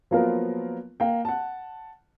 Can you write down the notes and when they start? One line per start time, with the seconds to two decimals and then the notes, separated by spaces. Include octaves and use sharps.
0.11 F3 F#3 A#3 B3 F4 A#4
1.00 A#3 G5
1.25 F#5 A5